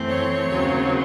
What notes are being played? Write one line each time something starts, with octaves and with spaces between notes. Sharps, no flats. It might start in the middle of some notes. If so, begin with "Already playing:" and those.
Already playing: F#2 E3 A3 C4
C#5
D#2 C#3 F#3 C4